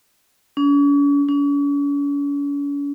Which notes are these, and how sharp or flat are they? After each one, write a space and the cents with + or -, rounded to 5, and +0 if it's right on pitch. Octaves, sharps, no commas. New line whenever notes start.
C#4 +45
C#4 +45